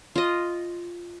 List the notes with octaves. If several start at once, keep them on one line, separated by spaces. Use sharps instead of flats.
F4 D#5